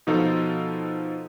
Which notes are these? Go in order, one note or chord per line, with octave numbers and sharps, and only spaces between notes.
B2 F3 D#4 F4 A4